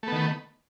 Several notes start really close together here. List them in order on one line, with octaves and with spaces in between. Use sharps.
A3 B3 D#3